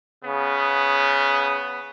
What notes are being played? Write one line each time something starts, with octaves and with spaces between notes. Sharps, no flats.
C#3 B3